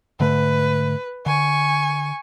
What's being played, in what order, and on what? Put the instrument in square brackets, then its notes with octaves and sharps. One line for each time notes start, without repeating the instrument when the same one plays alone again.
[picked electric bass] G#2 D3 A3 [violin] B4
[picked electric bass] D3 [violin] G#5 C#6